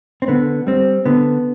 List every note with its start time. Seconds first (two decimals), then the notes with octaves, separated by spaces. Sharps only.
0.22 C4
0.28 D3 B3
0.67 G3 C4
1.06 D3 B3